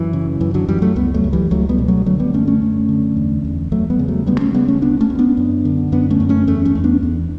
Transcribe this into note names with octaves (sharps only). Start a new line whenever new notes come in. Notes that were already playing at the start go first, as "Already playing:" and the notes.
Already playing: F#2 E3
C#3
F#2 E3
D3 F#3
F#2 E3 G3
F#3 A3
C#2 G3 B3
F#3 A3
C#2
E3 G3
C#2 F#3 A3
G3 B3
B2
F#3 A3
D3 F#3 A3
G3 B3
F#2 A3 C#4
A3 C#4
F#2
D3
E2
E2
E2 F#3 A3
G3 B3
C#3
F#3 A3
D2 G3 B3
A3 C#4
C#3 G3 B3
A3 C#4
D2 B3 D4
A3 C#4
D2
B3 D4
F#2
D3
F#2 B3 D4
A3 C#4
F#2
A3 C#4
E2 A3 C#4
A3 C#4
E2
B3 D4
E2